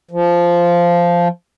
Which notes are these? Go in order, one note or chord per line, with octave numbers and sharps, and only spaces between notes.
F3